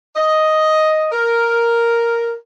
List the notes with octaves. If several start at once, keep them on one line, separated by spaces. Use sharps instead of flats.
D#5
A#4